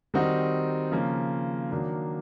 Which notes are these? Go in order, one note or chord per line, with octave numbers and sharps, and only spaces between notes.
D#3 G3 C4 D#4 F#4
C#3 F3 A#3
D#3 F#3 A#3 D4